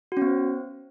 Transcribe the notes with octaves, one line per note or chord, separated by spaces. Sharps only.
B3 C#4 F#4 C5